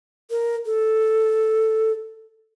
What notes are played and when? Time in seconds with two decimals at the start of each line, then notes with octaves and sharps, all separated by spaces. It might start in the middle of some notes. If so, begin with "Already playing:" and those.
0.31 A#4
0.66 A4